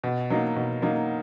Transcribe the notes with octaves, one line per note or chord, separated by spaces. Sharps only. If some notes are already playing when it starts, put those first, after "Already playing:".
B2
F#3 A#3 D#4
B2
F#3 A#3 D#4